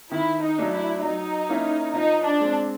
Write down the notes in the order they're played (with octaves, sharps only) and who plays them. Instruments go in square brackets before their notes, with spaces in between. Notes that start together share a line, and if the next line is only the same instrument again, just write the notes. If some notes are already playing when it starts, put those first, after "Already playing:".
[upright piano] D#3 [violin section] E4
[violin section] D#4
[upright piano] F#3 A3 D4
[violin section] E4
[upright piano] F#3 [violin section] D#4
[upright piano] A#3 C#4 E4
[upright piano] F3 [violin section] D#4
[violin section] D4
[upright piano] G#3 C4